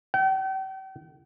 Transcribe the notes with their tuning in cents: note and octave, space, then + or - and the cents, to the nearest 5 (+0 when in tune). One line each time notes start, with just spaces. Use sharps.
G5 -40